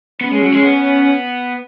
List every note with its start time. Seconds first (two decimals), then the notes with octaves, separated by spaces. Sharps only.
0.21 B3 C#4
0.31 G#3
0.42 F#3
0.52 G#3
0.63 B3